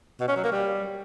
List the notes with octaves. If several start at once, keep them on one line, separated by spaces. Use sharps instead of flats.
B2
C#4
F#3
A#3
G3